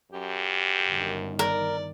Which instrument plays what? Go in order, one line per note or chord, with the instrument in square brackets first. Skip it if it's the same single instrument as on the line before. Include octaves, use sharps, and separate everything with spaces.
[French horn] F#2 [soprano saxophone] G4
[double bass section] G1 D#3
[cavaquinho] A#4 [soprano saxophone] D5